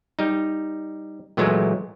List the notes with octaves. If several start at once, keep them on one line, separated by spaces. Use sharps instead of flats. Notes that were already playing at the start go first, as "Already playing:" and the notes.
G3 D#4
A#2 E3 F#3 G#3 A3